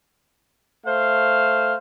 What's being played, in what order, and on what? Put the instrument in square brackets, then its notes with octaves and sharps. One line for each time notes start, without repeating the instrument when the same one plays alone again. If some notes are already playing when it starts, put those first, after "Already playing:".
[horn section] A3 C5 F5